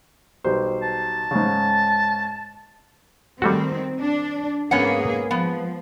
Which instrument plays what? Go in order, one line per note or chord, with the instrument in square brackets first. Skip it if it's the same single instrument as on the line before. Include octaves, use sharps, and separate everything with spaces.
[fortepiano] B1 G3 C5
[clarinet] A5
[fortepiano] G#2 C#3
[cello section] D#3 C4 [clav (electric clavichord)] G3 A3 F#4
[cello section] D4
[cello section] G#2 A#3 G#4 [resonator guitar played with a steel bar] B3 C#4 F#5
[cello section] F3 [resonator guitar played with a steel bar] B3